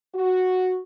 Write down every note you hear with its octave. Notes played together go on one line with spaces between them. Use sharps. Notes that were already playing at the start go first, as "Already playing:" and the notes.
F#4